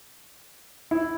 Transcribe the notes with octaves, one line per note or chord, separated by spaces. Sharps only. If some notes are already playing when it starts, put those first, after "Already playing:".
E4